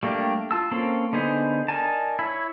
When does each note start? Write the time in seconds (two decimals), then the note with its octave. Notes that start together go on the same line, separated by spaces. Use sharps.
0.03 G3 A3 A#3 D4 G4
0.51 F4 A5 E6
0.71 A#3 C4 C#4 A4
1.13 D3 B3 D#4 G#4 C5
1.68 D#4 A#4 D5 G#5 A5
2.19 E4 C#5